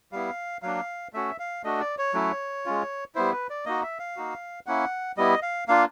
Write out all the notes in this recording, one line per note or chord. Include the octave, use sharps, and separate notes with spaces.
G3 B3 E4 F5
F#3 A#3 D4 F5
A3 C#4 F#4 E5
F5
A3 D4 F#4 D#5
D5
C#5
F#3 A3 C#4 E4
G#3 C#4 F4
G3 B3 E4 C5
B4
D5
A#3 D#4 F#4 D#5
E5
F5
A#3 D#4 F#4
A#3 C#4 E4 F#5
G3 B3 E4 D#5
F5
A#3 D4 F4 F5